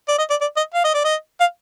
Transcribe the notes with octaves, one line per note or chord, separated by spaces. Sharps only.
D5
D#5
D5
D5
D#5
F5
D#5
D5
D#5
F5